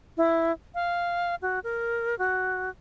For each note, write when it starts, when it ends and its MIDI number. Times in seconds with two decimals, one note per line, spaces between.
0.17 0.52 64
0.75 1.35 77
1.42 1.59 66
1.64 2.18 70
2.19 2.70 66